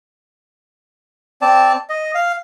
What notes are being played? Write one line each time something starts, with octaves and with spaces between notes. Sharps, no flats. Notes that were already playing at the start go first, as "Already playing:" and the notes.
C4 D5 A5
D#5
F5